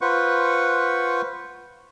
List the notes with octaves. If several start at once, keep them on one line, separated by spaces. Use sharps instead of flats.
F4 B4 C5 F#5 C#6